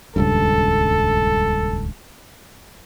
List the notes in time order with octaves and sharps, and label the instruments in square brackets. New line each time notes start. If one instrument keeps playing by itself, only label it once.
[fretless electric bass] D#1 C#2 G2 [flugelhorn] A4